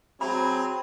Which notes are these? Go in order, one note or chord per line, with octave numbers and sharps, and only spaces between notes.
F#3 C4 G#4 B5